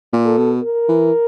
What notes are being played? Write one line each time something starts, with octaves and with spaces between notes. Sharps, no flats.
A#2
A4
B2
A#4
E3